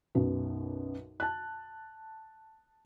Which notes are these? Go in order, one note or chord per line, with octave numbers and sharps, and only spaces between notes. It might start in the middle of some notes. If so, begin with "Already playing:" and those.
B1 F#2 B2
A5 F#6